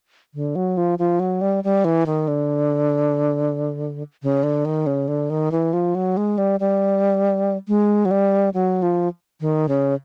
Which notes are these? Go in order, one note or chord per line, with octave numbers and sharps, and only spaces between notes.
D3
F#3
F3
F3
F#3
G3
G3
E3
D#3
D3
C#3
D3
D#3
C#3
D3
D#3
E3
F3
F#3
G#3
G3
G3
G#3
F#3
G3
F#3
F3
D#3
C#3